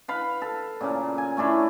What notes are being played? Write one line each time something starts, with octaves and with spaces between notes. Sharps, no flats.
B4 F5 B5
A4
A#2 C#3 A#3
G#5
A3 C#4 D4 E4